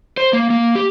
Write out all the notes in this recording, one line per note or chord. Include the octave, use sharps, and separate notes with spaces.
C5
A#3
A#3
G4